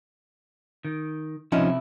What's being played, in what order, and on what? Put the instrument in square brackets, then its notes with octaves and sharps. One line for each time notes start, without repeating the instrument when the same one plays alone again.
[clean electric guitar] D#3
[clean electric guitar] C3 E4 [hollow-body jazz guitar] F3 C#4 D#4